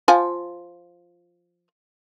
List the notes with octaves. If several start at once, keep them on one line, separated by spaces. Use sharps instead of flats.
F3 F4 G#5